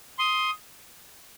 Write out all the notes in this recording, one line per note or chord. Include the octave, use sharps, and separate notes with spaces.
C6 D#6